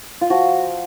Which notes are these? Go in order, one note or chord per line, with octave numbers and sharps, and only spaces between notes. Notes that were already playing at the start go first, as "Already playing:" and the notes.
F4
F3 F#4